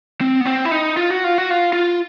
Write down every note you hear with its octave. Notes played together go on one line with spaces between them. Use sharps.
C4
B3
C4
E4
D#4
F4
F#4
F4
F#4
F4
F4